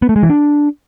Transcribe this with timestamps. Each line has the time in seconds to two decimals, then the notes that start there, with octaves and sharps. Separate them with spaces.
0.02 B3
0.09 A3
0.16 G#3
0.23 E3
0.29 D4